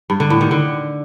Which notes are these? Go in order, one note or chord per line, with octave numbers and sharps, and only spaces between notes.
G2
D3
A2
D#3
D3